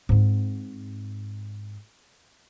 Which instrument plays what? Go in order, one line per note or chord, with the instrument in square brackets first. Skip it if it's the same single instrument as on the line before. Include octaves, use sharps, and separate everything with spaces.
[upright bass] G#2 C4